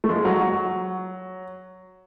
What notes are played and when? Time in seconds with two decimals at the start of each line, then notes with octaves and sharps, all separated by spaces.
0.04 A3
0.09 F3 G#3
0.25 F#3
0.42 F#3